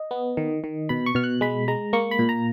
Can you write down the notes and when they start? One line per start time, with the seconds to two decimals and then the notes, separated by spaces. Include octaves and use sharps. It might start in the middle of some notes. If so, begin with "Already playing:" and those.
Already playing: D#5
0.11 B3
0.37 D#3
0.64 D#3
0.89 B2 B5
1.06 C#6
1.15 B2 F6
1.24 F#6
1.41 G#3 B5
1.68 G#3 A#5
1.93 A#3 C#6
2.11 B5
2.19 A#2
2.29 A#5